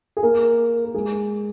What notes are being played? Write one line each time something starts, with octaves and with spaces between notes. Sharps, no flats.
G#4
A#3 A#4
A#4
G#3 G#4